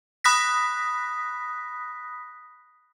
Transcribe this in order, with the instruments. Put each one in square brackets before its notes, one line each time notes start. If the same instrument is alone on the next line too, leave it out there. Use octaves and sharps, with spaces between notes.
[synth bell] B5 D#6 F#6 A#6 B6